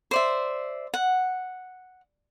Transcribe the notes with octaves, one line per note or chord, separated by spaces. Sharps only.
C5 D5 E5
F#5